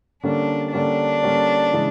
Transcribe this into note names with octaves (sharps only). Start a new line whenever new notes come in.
D3 G3 A#3 C#4 D4
D3 G3 A#3 C#4 D4
D3 G3 A#3 C#4
C#3 E3 G#3